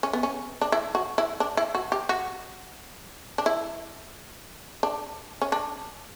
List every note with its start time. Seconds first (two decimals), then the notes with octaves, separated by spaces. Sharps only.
0.03 C#4
0.13 B3
0.23 C#4
0.61 D4
0.72 E4
0.95 F#4
1.18 E4
1.40 D4
1.57 E4
1.75 F#4
1.92 G4
2.09 F#4
3.38 D4
3.46 E4
4.83 D4
5.42 C#4
5.52 D4